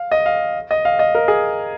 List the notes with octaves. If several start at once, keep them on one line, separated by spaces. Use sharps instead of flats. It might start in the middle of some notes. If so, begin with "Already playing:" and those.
Already playing: F5
D#5
F5
D#5
F5
D#5
A#4
G#4